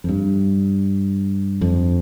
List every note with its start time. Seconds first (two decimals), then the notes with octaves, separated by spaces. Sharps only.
0.04 F2
0.08 G2
1.61 F2